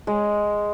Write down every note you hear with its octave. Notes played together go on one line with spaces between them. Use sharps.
G#3